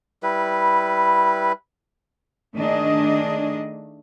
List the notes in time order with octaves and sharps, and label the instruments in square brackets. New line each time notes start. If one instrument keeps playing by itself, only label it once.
[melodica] G3 E4 B4
[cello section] D#3 A3 D4 G#4 D#5